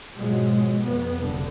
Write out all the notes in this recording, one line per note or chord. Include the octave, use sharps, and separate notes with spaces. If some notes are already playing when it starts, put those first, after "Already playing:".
G#2 B2 F3 F#3 G#3
F2 B3
F#1 C2 D3